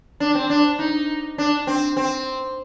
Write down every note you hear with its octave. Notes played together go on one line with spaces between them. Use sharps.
D4
C4
D4
D#4
D4
C4
C4